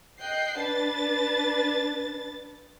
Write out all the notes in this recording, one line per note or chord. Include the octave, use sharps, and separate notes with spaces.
D#5 G5 F#6 C7
D4 B4 A6